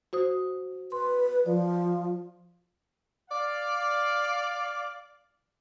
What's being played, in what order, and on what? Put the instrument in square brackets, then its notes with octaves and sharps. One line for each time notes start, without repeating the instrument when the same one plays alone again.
[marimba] F#4 C5 D#6
[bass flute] B4 [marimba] C6
[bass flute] F3 [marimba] D5
[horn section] D5 F5